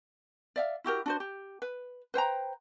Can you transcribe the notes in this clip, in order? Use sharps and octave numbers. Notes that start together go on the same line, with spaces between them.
D5 E5 F5
E4 F#4 G4 A#4
D4 F#4 C5
G4
B4
B4 C5 G5 A#5